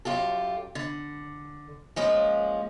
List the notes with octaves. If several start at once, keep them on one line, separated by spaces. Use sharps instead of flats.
F#2 F4 G4 A4
D3
F3 G#3 A#3 C#4 F4